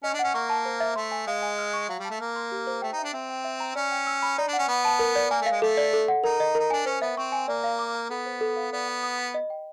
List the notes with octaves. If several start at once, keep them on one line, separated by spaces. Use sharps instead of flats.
C#4 D#5
D4
C#4 F#5
A#3 C#6
A5
C5
E5
A3 C6
G#5
G#3 F5
G#5
F6
C#6
F#3 F5
G3
A5
A3
A#3 F6
C6
G4
C5
A3 G5
D#4
E5
D4
C4 E5
G5
E5
A#5
C#4 D5
G5
E6
B5
D#4 D5
D4
F#5
C#4
B3 C#6
A5
A#4
D5
A#3 G#5
A3
F5
G#3
A3 A4
D5
A4
F#5
D#4 A#4
D#5
D#4 A#4
D4 G#5
C#4 C5
B3 E5
C4 C#6
G#5
A#3 D5
F5
D6
A#5
B3 A4
C5
A4
F5
B3 D5
F#5
D#6
B5
D#5
G5